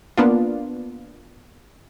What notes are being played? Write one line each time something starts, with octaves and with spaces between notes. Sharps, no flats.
A#3 B3 D4 F4